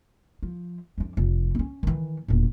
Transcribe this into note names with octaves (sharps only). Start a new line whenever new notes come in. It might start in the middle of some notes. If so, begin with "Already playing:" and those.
F3
F2 D4
F1
C4 C#4
D#3 E3
E1 A#2